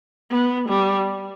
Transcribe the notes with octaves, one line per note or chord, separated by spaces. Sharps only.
B3
G3